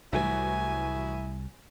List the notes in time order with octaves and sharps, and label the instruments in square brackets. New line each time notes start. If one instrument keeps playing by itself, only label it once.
[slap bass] C2 G3 [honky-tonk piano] A2 E3 F#3 [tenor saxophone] E4 [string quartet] G#5